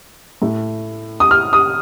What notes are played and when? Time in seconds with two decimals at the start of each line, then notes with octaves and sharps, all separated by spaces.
0.42 A2 A3
1.20 D#6
1.31 F6
1.53 D#6